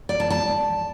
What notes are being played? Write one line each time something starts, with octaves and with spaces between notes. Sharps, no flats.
D5
A5
A5